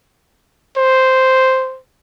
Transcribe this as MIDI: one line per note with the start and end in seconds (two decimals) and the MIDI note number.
0.77 1.79 72